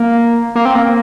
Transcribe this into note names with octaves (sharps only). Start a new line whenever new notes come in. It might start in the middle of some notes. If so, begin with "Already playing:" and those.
Already playing: A#3
A#3
C4
A#3